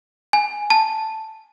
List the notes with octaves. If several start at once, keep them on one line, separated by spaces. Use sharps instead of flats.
G#5
A5